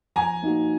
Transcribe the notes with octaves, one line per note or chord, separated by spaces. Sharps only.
F3 G#5 A#5
A#3 D#4 F#4